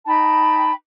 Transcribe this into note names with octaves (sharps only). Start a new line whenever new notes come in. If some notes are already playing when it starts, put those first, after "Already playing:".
D#4 G5 A5 B5